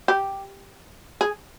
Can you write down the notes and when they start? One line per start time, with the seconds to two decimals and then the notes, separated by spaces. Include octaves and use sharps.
0.08 G4
1.21 G#4